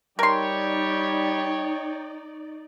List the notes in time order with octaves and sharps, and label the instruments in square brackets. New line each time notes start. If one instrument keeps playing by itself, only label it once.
[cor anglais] G3 [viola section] D#4 D5 [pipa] A#4 C6 [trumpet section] C#5 G5